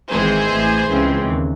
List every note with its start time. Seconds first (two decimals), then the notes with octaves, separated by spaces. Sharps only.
0.11 G#1 G#2 E3 G#3 C4 G#4 C5
0.50 A1 A2 E3
0.88 C#2 C#3 E3 G#3 C4
1.25 D#2